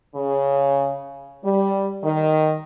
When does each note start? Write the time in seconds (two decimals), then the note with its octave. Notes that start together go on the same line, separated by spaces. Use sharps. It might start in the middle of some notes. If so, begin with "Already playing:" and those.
0.15 C#3
1.44 G3
2.04 D#3